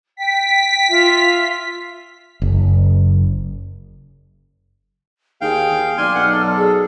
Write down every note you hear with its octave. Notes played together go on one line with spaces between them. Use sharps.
G5 B6
F4 E5
F#1
D#2 G#4 F5 G5
D#2
B1 D5 G#5 C6 F6
B1 F#5
A4
G#4